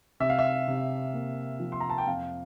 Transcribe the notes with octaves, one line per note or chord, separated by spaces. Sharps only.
C3 E5
F5
E5
C3
A#3
F3
C6
A#5
A5
G5
F2 F5